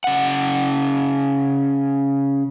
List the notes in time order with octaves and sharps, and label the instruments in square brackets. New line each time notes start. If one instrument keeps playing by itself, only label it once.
[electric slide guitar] C#3 F#5